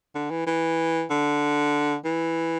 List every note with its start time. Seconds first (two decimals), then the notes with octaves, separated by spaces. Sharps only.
0.15 D3
0.30 E3
0.46 E3
1.10 D3
2.05 E3